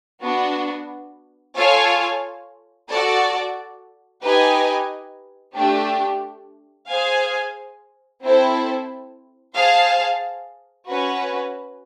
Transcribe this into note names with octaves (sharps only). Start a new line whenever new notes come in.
B3 D4 F#4
F4 A4 C#5 F5 G#5
F#4 A4 D5
D#4 G4 B4 D#5 G#5
A3 D4 G4
G#4 C5 F5 G#5
C4 E4 A4 C5
G#4 C5 F5 A5
C#4 F#4 B4